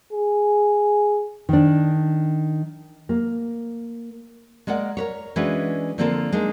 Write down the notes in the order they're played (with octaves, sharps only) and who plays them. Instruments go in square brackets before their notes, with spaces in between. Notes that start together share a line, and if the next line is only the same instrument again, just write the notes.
[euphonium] G#4
[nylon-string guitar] D#3 D4
A#3
G#3 A#3 D5 F#5
A#4 B4 C#5
E3 G#3 C#4 D4 F#4 B4
D3 F3 A#3 C4 F4 A4
G#3 A#3 D4 D#4